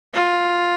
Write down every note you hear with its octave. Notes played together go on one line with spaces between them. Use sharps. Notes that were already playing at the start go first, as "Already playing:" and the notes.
F4